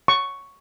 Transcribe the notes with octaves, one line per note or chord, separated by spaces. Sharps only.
C#6